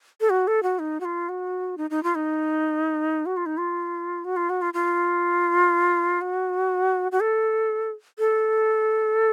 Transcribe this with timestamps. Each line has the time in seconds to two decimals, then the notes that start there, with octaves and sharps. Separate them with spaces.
0.21 A4
0.30 F#4
0.47 A4
0.63 F#4
0.79 D#4
1.00 F#4
1.05 F4
1.29 F#4
1.78 D#4
1.90 D#4
2.03 F4
2.15 D#4
3.26 F#4
3.37 F4
3.46 D#4
3.58 F4
4.25 F#4
4.36 F4
4.50 F#4
4.62 F4
4.74 F4
6.21 F#4
7.12 F#4
7.20 A4
8.19 A4